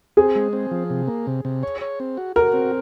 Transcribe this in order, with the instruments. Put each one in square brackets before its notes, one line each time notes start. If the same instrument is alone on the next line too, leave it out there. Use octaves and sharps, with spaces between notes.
[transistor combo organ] C4 [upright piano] G#4
[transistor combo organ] G#3
C4
F3
C3
A#3
C3
C3
C#5
C#5
C4
F#4
[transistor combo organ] F#4 [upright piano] A#4
[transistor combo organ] C4